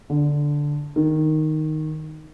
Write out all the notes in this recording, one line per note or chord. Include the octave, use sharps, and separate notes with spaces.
D3
D#3